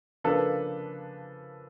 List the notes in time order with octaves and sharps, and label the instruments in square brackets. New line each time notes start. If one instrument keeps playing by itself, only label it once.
[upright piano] C#3 F3 A#3 D4 A4 B4